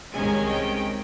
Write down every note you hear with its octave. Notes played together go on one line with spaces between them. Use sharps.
C2 C3 D#3 G#3 C#4 G#5
G5